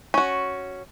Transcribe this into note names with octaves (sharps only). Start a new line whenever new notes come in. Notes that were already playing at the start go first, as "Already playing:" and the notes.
C#4 F#4